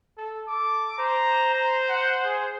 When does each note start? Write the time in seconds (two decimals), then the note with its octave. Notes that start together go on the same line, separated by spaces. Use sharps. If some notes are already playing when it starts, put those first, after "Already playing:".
0.18 A4
0.48 A4 D6
0.99 C5 A#5
1.54 A#5
1.89 F#5
2.25 G#4